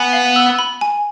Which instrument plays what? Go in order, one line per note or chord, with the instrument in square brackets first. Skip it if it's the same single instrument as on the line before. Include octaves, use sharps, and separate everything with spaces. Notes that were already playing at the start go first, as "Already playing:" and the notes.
Already playing: [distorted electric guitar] B3 [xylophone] G#5
[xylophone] F5
E6
B5
G#5